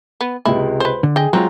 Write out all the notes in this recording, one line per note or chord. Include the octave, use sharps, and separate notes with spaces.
B3
C#2 C3 G#3 E4
B4 C5
D3
G#4 D#5 G5
F#3 G#3 C4 F4 A#5